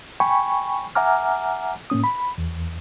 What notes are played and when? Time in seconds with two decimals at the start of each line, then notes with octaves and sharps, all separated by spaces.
0.20 G5 G#5 B5 C#6
0.95 E5 F#5 G#5 A#5 D6 F6
1.90 A2 A#3 C#4 D#6
2.04 B5
2.38 E2